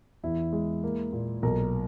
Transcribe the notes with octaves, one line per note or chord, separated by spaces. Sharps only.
E2 E4
G#3
A#3
A#2
B1 A#4